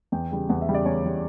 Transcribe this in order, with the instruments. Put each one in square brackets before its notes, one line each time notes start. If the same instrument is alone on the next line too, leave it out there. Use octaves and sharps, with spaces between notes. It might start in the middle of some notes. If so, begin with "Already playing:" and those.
[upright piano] E2 G5
C#3 G3
E2 F#5
E5
C#3 G3
D5
E2 C#5
C#3 G3